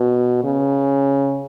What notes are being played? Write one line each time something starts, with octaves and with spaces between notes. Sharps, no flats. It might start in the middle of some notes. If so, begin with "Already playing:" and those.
Already playing: B2
C#3